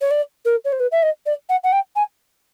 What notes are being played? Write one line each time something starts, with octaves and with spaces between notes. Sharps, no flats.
C#5
D5
A#4
C#5
C5
B4
E5
D#5
D5
F#5
F#5
G5
G#5